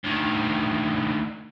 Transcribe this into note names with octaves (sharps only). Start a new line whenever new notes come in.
D2 D#3